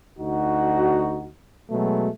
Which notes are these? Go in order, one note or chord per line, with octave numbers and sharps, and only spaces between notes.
D2 D#4 F#4
B2 F#3 G#3 A3